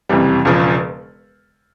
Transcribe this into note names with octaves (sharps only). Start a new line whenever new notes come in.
F#1 F2 C3 E3 G3
E1 E2 C#3 F3